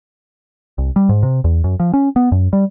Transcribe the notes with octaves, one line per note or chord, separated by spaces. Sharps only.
C2
G3
G#2
C3
E2
F#2
F3
C#4
B3
F#2
G3